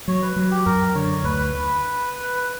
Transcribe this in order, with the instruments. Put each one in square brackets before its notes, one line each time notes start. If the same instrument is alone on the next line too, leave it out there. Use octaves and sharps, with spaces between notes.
[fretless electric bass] F#3 [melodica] C#5
[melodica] B4
[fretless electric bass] F#3
[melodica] G4
[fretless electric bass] F#2 [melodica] A#4
[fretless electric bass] D3 [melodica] C#5
[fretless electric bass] D2 [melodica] B4